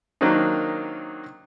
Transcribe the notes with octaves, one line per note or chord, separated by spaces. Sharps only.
D#3 F#3 A#3 C4 D4 D#4